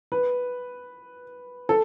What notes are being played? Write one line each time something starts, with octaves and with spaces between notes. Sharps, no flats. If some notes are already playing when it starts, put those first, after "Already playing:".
B4
A4